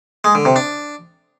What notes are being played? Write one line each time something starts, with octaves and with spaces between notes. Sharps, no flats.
G#3
D3
C3
D4